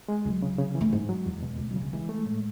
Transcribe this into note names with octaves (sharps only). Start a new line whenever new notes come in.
G#3
C#2 F#3
C#3
C#3
E3
A3
G#2 G#3
F#3
E2
B2
C#2 A3
F#3
C#3
G#3
E3 G#3
A3
A2